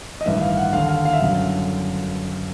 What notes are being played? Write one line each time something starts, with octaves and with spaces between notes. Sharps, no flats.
D#5
A1 G2 D#3 E5
F5
F#5
D#2 D3 F5
F5
F5
E5
G1 F#2 D3 F5